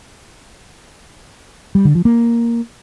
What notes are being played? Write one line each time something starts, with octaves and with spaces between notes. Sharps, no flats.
G3
D3
F3
A#3